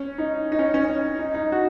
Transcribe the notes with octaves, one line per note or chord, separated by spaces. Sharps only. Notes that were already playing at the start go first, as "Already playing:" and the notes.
Already playing: C#4
D#4
D#4
C#4
C#4
C#4
D#4
D#4
F#4